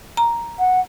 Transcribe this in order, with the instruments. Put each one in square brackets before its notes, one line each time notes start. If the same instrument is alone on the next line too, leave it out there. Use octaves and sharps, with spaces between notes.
[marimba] A#5
[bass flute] F#5